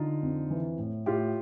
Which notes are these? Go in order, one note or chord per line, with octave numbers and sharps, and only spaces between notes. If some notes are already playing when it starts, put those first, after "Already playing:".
Already playing: D3 D#4 F4
F2
E3
A2
A2 F4 G4